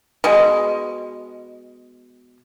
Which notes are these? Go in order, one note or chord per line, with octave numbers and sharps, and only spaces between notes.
B2 G#3